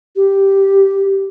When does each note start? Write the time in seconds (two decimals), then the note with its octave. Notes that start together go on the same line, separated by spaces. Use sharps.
0.16 G4